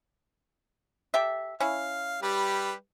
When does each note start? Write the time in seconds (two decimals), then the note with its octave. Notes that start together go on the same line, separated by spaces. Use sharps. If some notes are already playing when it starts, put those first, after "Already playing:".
1.14 G4 A4 E5
1.60 C#4 E4 F5
2.23 G3 G4 B4